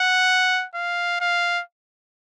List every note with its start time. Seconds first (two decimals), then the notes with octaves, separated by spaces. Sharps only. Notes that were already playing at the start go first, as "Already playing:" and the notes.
Already playing: F#5
0.75 F5
1.21 F5